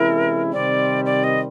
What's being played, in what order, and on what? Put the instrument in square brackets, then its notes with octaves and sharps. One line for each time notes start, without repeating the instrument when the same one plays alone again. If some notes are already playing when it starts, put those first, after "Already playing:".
Already playing: [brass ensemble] C3 E3 G#3 C#4 E4 [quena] A#4
[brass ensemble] C3 D#3 G3 C4 [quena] D5
[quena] D5
D#5